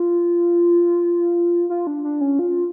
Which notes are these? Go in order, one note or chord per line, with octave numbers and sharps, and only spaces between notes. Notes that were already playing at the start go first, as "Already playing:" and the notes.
Already playing: F4
F4
D4
D4
C#4
F4